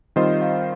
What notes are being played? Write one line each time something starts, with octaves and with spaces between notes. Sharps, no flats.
D#3 G3 C4 F4 C5 D#5
F5